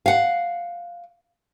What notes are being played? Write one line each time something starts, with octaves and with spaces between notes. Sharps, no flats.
F5 F#5